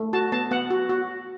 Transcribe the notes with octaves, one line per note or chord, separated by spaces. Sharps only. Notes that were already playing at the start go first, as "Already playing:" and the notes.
Already playing: A3
F#4 A5
B3 A5
B3 F#5
F#4
F#4